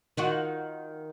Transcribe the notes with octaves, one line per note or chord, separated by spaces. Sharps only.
D#3 F4 F#4